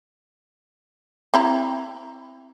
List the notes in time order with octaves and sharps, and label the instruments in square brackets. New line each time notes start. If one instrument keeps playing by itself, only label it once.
[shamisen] C4 E4 A#5